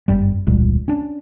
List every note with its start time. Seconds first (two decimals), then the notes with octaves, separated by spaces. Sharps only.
0.08 G1 F#2 G3
0.47 E1 C#2 A#2 G3
0.88 C#4 D4